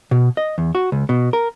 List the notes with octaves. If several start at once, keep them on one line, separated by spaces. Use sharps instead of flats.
B2
D#5
E2
F#4
C#2
B2
A#4